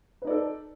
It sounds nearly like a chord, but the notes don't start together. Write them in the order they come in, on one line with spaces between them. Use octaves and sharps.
B4 D#4 D5 A4